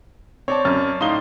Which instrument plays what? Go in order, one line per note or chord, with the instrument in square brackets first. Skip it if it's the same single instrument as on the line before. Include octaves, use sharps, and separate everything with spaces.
[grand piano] C4 [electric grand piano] C#5 D5 A5
[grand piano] F#2 F6 A6
[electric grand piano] A2 F5 C6 [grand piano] D#4 G7